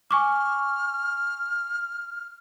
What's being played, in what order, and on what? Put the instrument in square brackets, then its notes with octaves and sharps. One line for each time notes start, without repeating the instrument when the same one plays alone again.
[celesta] G#5 C#6 D6 [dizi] F6